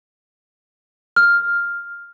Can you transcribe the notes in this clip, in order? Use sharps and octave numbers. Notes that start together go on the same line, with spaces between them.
F6